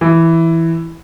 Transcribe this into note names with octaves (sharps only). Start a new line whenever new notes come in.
E3